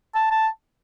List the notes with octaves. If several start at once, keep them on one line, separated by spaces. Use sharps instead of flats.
A5
A5